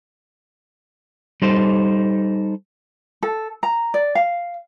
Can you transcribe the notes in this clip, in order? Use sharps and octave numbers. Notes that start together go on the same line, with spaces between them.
G3 D#4 A4 C5
A4
A#5
D5
F5